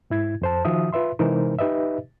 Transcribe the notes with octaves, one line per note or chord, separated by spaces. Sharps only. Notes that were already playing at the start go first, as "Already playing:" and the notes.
G#2 E4 G#6
F2 C5 A5
D#3 F3 F#4 E5 D#6
F4 B4 E5 C6
C3 E3 G#3 D#4 A#4 C5
D#4 G4 B4 D#5 E5